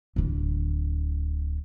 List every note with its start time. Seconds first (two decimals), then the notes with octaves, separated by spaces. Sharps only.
0.16 D1 D3